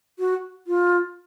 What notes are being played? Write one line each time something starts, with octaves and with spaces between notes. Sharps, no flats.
F#4
F4